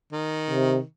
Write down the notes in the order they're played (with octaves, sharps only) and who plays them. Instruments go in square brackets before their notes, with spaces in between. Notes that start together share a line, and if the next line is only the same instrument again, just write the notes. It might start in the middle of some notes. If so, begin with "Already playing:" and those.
[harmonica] D#3
[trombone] C3